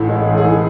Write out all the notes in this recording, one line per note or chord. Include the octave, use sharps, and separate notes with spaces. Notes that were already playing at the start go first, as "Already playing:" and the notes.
Already playing: A1 A2 E3
G#3
A1 G#4
G#4
E3 A4